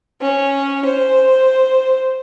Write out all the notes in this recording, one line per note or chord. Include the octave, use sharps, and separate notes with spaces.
C#4
C5